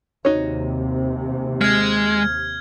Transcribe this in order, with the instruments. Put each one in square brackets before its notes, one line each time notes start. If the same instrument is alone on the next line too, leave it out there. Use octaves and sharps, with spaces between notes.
[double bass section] D#2 C3 [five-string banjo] D#4 F#4 C#5
[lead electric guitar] G#3 [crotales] F6 G#6